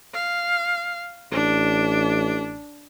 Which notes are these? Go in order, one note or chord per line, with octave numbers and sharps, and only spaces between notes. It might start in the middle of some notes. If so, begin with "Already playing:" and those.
F5
A1 D4